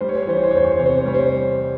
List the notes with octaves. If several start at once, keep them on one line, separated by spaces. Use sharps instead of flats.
G3 C5
C#5
C5
C#5
E3 C5
C#5
C5
C#5
E2 C5
C#5
C5
C3 C#5
C5
C#5
C5
G3 C#5
C5